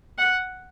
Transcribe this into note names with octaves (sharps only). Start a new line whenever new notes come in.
F#5